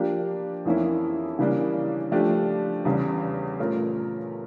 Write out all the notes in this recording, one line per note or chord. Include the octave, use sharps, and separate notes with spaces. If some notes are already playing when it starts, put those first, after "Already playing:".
Already playing: F3 A#3 D4 G4
F2 E3 A#3 C#4 E4
C#3 E3 G3 A#3 D4
F3 A3 D4 G4
E2 C#3 G3
A#2 A3 C#4 F4 A#4